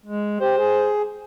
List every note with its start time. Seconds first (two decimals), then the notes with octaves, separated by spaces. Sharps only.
0.06 G#3
0.40 G4 C5
0.57 G#4